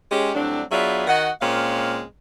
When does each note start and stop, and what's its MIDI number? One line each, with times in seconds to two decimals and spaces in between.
0.12 0.34 56
0.12 0.34 61
0.12 0.34 67
0.34 0.63 45
0.34 0.63 54
0.34 0.63 55
0.34 0.63 60
0.34 0.63 62
0.72 1.07 54
0.72 1.07 59
0.72 1.07 62
0.72 1.07 65
0.72 1.07 68
0.72 1.07 76
1.07 1.30 51
1.07 1.30 66
1.07 1.30 75
1.07 1.30 78
1.41 2.04 46
1.41 2.04 56
1.41 2.04 60
1.41 2.04 61
1.41 2.04 77